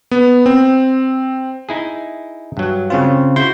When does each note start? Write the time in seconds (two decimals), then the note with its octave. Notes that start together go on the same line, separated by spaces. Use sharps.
0.11 B3
0.46 C4
1.69 D#4 E4 G#4
2.57 G2 F#3
2.90 C#3 C4 F4
3.36 E4 F#4 C6 G6